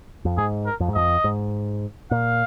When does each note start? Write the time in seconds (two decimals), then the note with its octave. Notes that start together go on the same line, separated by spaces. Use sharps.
0.25 F2
0.38 G#2 G#4
0.66 A#4
0.80 F2
0.88 G#2
0.95 F2 D#5
1.24 G#2
2.11 A#2 F5